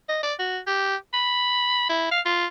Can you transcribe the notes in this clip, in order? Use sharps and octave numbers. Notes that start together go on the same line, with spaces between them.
D#5
D5
F#4
G4
B5
E4
F5
F4